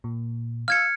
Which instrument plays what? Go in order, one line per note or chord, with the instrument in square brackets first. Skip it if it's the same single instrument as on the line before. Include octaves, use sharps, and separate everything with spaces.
[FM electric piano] A#2
[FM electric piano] F5 E6 [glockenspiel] F6 G#6 C#7